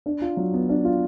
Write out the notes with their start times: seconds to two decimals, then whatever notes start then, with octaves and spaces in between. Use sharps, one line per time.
0.06 D4
0.22 F4
0.37 F#3
0.54 B3
0.69 D4
0.85 F4